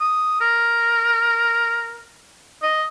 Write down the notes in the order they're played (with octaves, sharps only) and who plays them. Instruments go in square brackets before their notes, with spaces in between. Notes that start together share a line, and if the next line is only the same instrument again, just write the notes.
[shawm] D#6
A#4
D#5